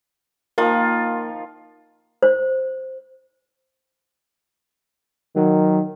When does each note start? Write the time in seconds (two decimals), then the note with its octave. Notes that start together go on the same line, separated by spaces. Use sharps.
0.58 D#3 F3 A#3 F4
2.23 C5
5.36 D#3 F#3